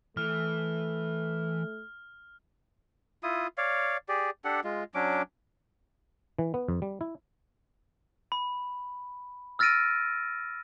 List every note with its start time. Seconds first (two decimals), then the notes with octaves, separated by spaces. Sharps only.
0.17 E3 A3 F6
3.23 E4 F4 D#6
3.58 C#5 D5 F5
4.09 G4 G#4 D5
4.45 D4 G4 A4 F#5
4.64 G#3 F4
4.95 F#3 C#4 D4 D6
6.39 E3
6.54 B3
6.68 F2
6.82 G3
7.01 E4
8.32 B5
9.59 E6 F6 A6 A#6 D7 D#7